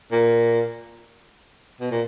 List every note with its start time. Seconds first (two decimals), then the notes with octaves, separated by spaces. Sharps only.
0.12 A#2
1.81 B2
1.91 A#2